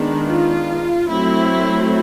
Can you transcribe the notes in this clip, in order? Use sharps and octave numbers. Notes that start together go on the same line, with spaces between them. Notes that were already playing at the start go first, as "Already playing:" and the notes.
Already playing: D#3 G#3 B3 D4
F4
F#3 A3 C4 E4